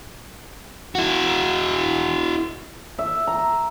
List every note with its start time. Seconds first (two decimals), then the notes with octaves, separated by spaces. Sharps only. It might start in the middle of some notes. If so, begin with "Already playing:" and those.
0.95 E4 F#4
2.99 E5
3.27 A#5